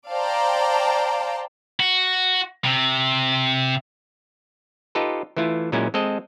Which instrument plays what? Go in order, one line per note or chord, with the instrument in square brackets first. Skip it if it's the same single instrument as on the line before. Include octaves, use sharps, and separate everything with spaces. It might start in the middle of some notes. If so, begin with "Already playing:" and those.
[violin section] C5 D5 F5 G5 A5 A#5
[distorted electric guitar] F#4
C3
[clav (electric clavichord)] D#4 F4 G4 A4 B4
E3 A3 E4 F4
A#2 F#3 G#3 C#4 E4
G#3 C4 A4 D#5